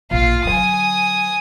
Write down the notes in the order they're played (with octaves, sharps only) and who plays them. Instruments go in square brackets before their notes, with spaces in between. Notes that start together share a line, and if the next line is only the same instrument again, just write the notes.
[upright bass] A#1 A#2 [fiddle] F4 F5
[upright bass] D3 F#3 [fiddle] G#5 D#6